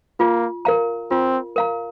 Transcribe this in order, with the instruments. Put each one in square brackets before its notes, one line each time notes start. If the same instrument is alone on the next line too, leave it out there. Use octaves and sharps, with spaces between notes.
[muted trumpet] A#3 [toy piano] F4
[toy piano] A#4 F5 A#5
[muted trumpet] C4 [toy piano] F4
[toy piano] A#4 F5 A#5